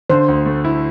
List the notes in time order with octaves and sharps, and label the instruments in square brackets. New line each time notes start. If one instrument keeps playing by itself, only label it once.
[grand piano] D3 [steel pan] C5
[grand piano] D2
A3
E4